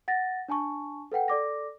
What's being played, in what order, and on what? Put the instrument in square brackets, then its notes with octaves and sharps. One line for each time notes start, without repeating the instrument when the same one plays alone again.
[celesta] F#5 A6 A#6
D4 G#5 A5 C#6
A4 B4 F#5 G5
A4 D5 D6 A#6